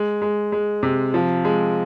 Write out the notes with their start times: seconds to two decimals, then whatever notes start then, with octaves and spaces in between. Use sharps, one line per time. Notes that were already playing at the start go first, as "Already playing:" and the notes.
Already playing: G#3
0.22 G#3
0.52 G#3
0.83 C3
1.14 F3
1.45 G#3